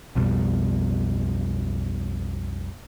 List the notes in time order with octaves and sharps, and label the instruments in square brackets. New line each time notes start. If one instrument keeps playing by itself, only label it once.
[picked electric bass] B1 F2 B2 G3